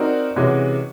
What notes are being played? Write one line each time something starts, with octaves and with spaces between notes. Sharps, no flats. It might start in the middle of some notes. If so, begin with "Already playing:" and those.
Already playing: C4 D#4 F#4 A#4 D5
C3 E3 G#3 C#4 F#4